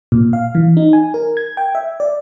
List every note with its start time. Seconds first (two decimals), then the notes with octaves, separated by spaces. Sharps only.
0.12 A#2
0.33 F5
0.55 E3
0.77 D#4
0.93 G#5
1.14 A#4
1.37 G#6
1.57 G5
1.75 E5
2.00 D5